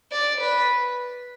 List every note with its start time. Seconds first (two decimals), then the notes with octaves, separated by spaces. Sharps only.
0.12 D5
0.41 B4